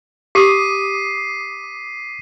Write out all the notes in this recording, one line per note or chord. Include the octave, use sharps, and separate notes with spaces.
G4 D6 D#6 B6 C7 D#7